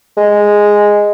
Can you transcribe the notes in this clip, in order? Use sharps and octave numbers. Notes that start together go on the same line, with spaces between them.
G#3